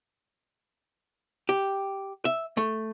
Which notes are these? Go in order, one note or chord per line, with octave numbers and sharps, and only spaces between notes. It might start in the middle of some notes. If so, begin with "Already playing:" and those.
G4
E5
A3